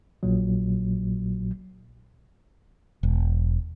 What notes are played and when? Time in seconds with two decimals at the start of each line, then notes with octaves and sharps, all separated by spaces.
0.23 A#1 A#2 F#3
3.03 E1